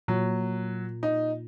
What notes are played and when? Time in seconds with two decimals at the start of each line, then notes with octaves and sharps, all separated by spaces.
0.08 A#2 F#3
1.03 D#4